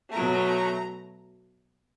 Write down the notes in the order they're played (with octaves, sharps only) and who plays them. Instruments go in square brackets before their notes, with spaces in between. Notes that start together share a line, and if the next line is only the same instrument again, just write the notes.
[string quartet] B2 F#3 A3 A#5